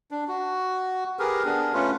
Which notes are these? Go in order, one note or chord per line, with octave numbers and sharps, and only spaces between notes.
D4
F#4
G4 G#4 A#4 B4
B3 D4 G#4 A#4
A3 C#4 F4 B4